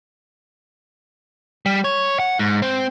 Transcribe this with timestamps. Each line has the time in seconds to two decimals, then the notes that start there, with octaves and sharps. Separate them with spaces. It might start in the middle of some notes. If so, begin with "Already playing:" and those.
1.66 G3
1.84 C#5
2.20 F#5
2.39 G#2
2.62 C4